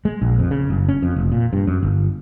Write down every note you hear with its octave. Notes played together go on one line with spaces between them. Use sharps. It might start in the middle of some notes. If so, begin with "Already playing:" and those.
G#3
A#1
F2
C#3
F#1
C#4
F2
F1
A#2
G2
F#2
G1